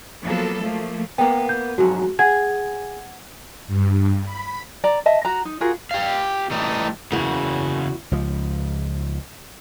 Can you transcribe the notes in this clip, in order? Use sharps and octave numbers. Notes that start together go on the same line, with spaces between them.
F3 F#3 A#3 B3 A4
F3 A3 A#3
A#3 B3 G5
G6
F2 G#2 F#3 F#4
G#4 F#5 G#6
G2
B5
D5 A#5
D#5 E5 A5
F#4 A#5
D#4
F4 F#4 G#4 A#4
G4 F5
E3 G3 A3 D#4
E2 C#3 A#3 F#4
C#2 F3